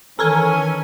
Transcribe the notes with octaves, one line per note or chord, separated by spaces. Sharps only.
D#3 E3 C#4 A4 A#4 C#5 G#5